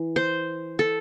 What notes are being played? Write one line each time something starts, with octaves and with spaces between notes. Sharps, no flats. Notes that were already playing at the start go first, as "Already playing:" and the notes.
Already playing: E3
C5
A4